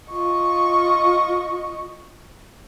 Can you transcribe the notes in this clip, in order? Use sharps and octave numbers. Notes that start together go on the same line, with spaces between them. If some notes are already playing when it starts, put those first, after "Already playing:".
F4 D#5 C#6